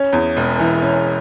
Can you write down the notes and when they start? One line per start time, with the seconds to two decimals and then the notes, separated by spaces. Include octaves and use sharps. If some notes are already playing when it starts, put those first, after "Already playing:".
Already playing: C#4
0.13 E2
0.37 E1
0.59 E3
0.82 C#4